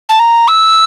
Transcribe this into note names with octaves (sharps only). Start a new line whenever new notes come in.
A5
A#5
E6